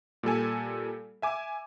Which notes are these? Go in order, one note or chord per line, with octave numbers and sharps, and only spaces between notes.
A#2 G3 A4 G#5
E5 G#5 D6